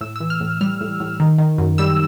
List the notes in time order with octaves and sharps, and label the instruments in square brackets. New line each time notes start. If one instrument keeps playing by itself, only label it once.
[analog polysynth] A2 E6
E6
E3
F6
A2
G3 F6
A2
A2
D#3
D#3
F#2
G3 E6